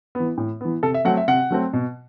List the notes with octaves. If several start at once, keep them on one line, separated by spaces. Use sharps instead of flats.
E3 B3
A2
E3 B3
C3 A4
E5
F#3 A3 C4 F#5
E5
C3 F#5
F#3 A3 C4
B2